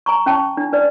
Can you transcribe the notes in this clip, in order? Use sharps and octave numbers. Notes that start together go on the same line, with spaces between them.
G#5 A#5 C#6
C#4 G5 A5 C#6
D4
D4 B4 D5